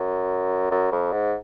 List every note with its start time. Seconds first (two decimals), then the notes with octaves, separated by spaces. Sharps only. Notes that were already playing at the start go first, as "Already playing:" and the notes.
Already playing: F#2
0.71 F#2
0.92 F2
1.13 G#2